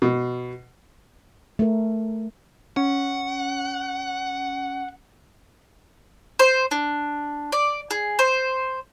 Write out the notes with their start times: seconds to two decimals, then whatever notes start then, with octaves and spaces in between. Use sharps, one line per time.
0.02 B2
1.59 A3 A#4
2.77 C#4 F#5
6.39 C5
6.71 D4
7.52 D5
7.91 G#4
8.19 C5